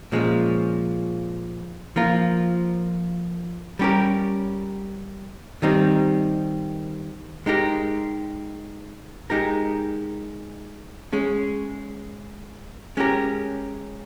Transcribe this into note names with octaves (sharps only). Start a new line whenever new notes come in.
A#2 F3 G#3 C#4
F3 A#3 F4 A#4
G3 C#4 G4 A#4
D#3 G3 C4 D#4 G4
G#3 D#4 G4 A#4
G#3 D#4 G4 A#4
G#3 C#4 G#4
G#3 C#4 G4 A#4